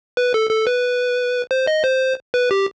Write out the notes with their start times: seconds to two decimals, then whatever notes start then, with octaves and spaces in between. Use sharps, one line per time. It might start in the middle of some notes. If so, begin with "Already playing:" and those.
0.17 B4
0.34 A4
0.50 A4
0.67 B4
1.51 C5
1.67 D#5
1.84 C5
2.34 B4
2.51 G4